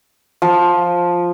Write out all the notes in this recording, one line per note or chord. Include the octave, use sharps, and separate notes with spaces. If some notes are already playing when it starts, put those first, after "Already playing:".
F3